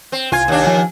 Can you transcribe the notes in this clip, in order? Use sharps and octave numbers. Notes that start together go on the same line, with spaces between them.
C4
C2 F4 G#5 G#6
D#2 D4
F3 G#5